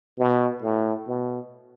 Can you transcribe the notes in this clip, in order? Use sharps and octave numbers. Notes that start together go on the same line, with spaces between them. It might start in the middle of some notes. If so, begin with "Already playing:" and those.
B2
A2
B2